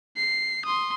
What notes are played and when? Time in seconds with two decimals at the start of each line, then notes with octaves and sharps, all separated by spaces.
0.17 C7
0.66 C6 D#6